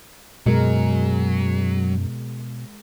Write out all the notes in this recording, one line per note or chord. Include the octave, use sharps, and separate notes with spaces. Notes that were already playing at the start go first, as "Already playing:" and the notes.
F#2 B2 F#3 G#3 A#4